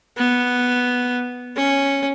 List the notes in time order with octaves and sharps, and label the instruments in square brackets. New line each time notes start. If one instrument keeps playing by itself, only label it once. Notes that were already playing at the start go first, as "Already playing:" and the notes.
[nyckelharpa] B3
C#4